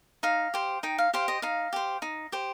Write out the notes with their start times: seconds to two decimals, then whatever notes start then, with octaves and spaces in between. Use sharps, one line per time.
0.23 D#4 F5
0.54 G4 C5
0.83 D#4 G5
0.99 F5
1.14 G4 C5 F5
1.28 D#5
1.42 D#4 F5
1.73 G4 C5
2.02 D#4
2.32 G4 C5